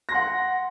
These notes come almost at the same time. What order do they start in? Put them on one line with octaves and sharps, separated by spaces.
A#6 C6 F#5